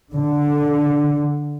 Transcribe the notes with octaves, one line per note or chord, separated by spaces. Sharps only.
D3